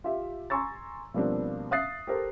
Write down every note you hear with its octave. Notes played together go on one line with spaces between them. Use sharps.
F4 G4 E5
G#5 A#5 C6 C#6 E6 A6
B2 F3 G3 A#3 C4 D4
E5 F5 D#6 F#6 A6 C7
G4 A4 A#4 C5